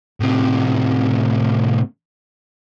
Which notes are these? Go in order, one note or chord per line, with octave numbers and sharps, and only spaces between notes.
A2 C3